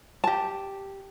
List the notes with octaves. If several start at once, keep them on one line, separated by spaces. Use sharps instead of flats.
G4 A5